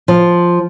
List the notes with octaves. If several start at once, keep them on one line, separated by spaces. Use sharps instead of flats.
F3